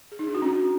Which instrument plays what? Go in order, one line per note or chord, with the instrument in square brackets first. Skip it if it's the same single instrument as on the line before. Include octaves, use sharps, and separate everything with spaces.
[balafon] G#4
D#4
D4
F#4
C#4